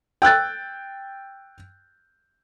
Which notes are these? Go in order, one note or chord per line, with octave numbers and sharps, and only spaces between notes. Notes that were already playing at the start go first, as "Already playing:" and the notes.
G5 E6 F#6 A6